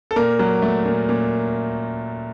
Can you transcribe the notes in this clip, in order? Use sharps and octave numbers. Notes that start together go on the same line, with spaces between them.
A4
A#2 A#4
F#3
A3
A#2
A#2